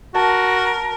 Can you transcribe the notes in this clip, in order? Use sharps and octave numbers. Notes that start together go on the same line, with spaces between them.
F#4 A#4 A5